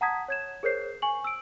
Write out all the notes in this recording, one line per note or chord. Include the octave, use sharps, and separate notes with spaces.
F#5 A5 A#5 D#6 G#6 B6
C#5 G#6 E7
G#4 A#4 C5 C#5 G6 C7
G#5 C#6 F#7
E6 D7